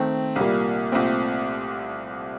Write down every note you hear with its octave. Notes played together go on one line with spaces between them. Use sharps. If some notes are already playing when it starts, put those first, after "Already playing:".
Already playing: D#3 A3 C4
C2 A#2 G3 A#3
C2 A#2 A3 C4